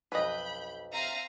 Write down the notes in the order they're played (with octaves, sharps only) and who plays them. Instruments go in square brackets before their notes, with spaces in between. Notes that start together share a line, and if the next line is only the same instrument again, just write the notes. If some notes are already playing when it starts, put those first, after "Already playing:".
[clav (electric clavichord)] B1 F2 E3 [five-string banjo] B4 D#5 [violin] B5 G6
[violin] C4 D#7 [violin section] E5 F5 A#5